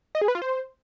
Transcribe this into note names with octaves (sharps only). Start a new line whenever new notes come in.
D#5
G#4
B4
F4
C5